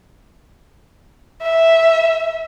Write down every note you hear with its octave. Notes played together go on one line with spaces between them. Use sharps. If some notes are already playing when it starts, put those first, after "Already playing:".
E5